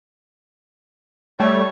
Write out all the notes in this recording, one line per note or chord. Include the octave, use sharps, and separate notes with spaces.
G3 A3 C#5